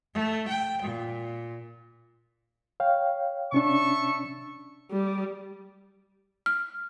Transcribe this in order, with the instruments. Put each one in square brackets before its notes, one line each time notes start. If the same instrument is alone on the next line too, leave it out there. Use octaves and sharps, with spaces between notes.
[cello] A3
G5
A#2
[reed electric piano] C#5 F5 G5
[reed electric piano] C3 C#4 D4 [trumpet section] E5 A5 C#6
[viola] G3
[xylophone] F6